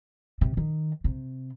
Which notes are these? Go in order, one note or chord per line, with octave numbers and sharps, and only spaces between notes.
C3
D#3
C3